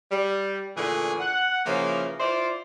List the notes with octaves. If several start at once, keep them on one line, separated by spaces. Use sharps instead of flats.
G3
A#2 D3 E3 A3 G#4
F#5
C#3 E3 F3 A#3
E4 F4 C5 D5